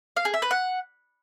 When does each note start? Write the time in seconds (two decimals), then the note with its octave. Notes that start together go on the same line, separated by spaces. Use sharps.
0.16 F5
0.25 G#4
0.34 E5
0.42 B4
0.51 F#5